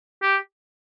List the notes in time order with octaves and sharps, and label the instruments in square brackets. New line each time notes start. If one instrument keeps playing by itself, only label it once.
[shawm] G4